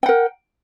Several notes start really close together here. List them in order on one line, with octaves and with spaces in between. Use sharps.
G5 F#5 A#4